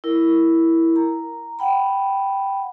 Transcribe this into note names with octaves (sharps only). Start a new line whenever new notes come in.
E4 A#4
A#5
F#5 G5 B5